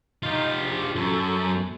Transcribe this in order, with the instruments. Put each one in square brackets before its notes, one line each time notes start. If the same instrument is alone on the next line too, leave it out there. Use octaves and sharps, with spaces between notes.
[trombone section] D#4 [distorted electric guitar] F4 G4
[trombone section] A#1
[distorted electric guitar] F#2 [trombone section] A4